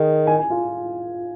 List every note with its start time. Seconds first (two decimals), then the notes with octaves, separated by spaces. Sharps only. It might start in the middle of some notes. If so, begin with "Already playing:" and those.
Already playing: D#3 G#4
0.27 G#5
0.39 G#5
0.50 F4